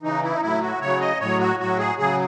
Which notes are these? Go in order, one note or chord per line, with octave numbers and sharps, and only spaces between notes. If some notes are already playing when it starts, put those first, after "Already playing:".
C#3 E3 D#4
E4
D#4
A2 F#3 E4
F#4
C#3 F#3 C#5
D#5
A2 F#3 C#5
F#4
A2 F#3 F#4
G#4
C#3 F#3 G#4